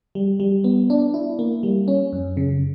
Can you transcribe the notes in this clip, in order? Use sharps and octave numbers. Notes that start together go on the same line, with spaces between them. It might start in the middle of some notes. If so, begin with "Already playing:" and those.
G3
G3
B3
D4
E4
A#3
G3
C#4
F#2
C#3